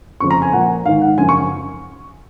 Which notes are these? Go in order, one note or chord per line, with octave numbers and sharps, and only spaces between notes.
F2 C#3 F3 C#6
A#5
G#5
A#2 F3 F#5
G#2 D#3 F5
F#5
F#2 C#3 F3 G#5
C#6